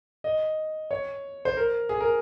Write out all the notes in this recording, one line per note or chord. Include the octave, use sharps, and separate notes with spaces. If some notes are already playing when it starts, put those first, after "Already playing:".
D#5
C#5
C5
A#4
G#4
A#4